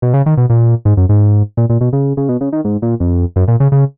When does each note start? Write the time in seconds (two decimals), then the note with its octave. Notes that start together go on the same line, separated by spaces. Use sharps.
0.02 B2
0.14 C#3
0.26 D#3
0.37 B2
0.50 A#2
0.85 G#2
0.97 F#2
1.09 G#2
1.57 A#2
1.69 A#2
1.81 B2
1.93 C#3
2.17 C#3
2.29 B2
2.41 C#3
2.53 D#3
2.64 G#2
2.82 A#2
3.00 F2
3.36 F#2
3.48 A#2
3.60 C#3
3.72 C#3